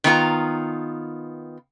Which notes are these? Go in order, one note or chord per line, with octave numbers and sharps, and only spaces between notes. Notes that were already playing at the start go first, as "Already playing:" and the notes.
D#3 B3 F4 A#5